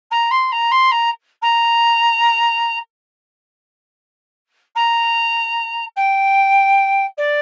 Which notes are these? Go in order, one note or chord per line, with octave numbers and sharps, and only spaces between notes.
A#5
C6
A#5
C6
A#5
A#5
A#5
G5
D5